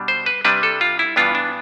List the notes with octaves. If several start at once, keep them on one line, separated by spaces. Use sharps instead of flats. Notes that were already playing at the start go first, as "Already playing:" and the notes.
Already playing: B2 G3 D4
C5
B4
C3 G3 D4 B4
A4
F4
E4
G2 E3 B3 D4 F4
D4